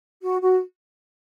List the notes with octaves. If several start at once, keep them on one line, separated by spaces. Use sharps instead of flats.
F#4
F#4